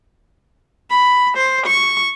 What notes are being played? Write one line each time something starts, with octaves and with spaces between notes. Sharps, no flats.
B5
C5
C#6